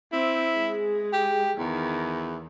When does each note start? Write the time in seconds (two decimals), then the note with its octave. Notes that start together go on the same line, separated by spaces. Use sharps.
0.12 C4 E4
0.56 G#3 G#4
1.13 G4
1.58 E2 D#3